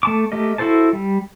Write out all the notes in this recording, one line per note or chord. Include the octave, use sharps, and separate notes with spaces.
A3 A5 D6
A3 G4 A#4 D#5
E4 F#4 A4 C5 A5
G3